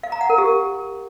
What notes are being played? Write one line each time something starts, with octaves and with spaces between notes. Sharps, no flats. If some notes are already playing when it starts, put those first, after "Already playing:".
F5
A#5
F#5
A#4
G4